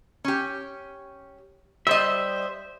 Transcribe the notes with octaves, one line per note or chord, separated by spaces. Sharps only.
C#4 G4
G3 C5 D#5 E5